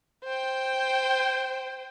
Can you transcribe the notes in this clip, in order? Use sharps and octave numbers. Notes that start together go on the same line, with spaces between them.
C5 G5